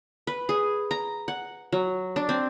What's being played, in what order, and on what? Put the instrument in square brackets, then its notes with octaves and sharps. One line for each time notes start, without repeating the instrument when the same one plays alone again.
[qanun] B4
G#4
A#5
F#5
F#3
D4
C4